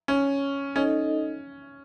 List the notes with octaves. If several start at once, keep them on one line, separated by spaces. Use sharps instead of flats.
C#4
C#4 D#4 A4 D#5